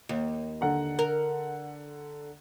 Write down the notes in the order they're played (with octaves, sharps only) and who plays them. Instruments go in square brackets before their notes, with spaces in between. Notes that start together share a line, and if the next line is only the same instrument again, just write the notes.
[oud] D#2
[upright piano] D3 F#5 A#5
[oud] A#4